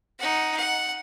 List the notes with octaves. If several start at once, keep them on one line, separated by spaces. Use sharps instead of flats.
D#4 F#5
F#5